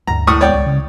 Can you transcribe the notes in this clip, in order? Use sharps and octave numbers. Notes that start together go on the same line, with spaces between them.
D2 G2 A#5
A2 C#6 D#6
G#3 B3 C#5 D5 G5
C#2
C#3